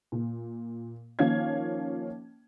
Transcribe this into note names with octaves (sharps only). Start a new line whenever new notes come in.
A#2
D#3 F3 A#3 C#4 F5 G#6